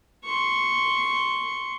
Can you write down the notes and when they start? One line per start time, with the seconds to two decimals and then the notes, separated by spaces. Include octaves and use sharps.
0.24 C6 C#6